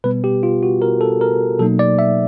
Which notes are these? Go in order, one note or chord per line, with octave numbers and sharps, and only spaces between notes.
B2 G3 B3 B4
G4
F4
F#4
A#4
A4
A#4
B2 F#3 A#3 D#4 A4
D5
E5